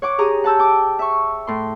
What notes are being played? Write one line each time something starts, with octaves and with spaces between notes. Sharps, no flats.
C#5 F#5 D6
G4 G#4 A#5 D#6
F#5 A5 E6 G6
G5 D6
E5 C#6
A2 C6